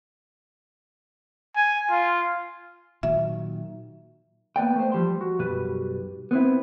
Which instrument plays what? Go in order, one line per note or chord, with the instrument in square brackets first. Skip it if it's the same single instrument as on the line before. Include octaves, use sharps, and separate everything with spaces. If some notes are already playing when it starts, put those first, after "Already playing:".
[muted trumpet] G#5
F4
[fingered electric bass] A#2 D#3 F#3 [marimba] E5
[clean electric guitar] A#3 B3 D5 G5
A3 C5
F3 G3 A5 C6
F#4
B1 F#2 G3 B4
B3 C4 E4